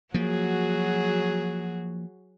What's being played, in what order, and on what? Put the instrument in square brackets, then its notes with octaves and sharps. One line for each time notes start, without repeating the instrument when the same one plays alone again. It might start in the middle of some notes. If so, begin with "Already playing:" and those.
[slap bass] F3 A#3 [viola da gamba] F#3 F#4 G#4